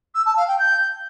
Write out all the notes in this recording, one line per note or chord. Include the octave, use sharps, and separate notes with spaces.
E6
A5
F5
G5
G6